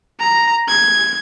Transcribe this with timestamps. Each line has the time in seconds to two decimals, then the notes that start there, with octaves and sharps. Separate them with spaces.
0.20 A#5
0.68 G#6